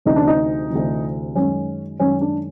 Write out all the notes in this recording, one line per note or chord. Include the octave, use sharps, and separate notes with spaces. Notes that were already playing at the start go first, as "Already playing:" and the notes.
D2 C3 E3 D#4
D4
D#4
D2 C3 E3
F#2 D#3 G#3 C#4
F#2 D#3 G#3 C#4
D4